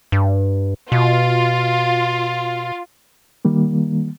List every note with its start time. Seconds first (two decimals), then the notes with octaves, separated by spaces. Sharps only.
0.12 G2
0.92 B2 F4
3.45 D#3 G3 A#3